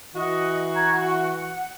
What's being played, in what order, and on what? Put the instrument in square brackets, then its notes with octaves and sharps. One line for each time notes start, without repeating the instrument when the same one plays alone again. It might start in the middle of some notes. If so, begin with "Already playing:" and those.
[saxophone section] E3 F#4 [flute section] D#5 F#5
[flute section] A#5 G#6
F#5